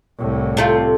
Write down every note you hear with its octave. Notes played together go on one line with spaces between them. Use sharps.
C2 A2
C3 A3 F4